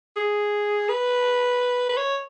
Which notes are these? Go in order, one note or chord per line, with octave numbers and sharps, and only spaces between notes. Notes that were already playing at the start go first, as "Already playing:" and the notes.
G#4
B4
B4
C#5